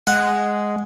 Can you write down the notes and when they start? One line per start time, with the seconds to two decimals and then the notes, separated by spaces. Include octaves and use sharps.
0.07 G#3 F#5